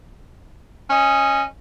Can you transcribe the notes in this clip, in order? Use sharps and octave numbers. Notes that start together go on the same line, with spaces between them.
C#4 D#5